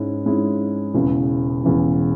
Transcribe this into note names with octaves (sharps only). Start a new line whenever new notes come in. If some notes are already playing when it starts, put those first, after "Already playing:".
Already playing: G#2 G#3 C#4 E4
G#2 G#3 C#4 E4
E1 E2 C#3 E3
E1 E2 C#3 E3